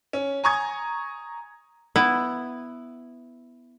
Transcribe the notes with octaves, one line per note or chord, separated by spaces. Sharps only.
C#4
G#5 A#5 C#6 D#6 G#6
B3 E4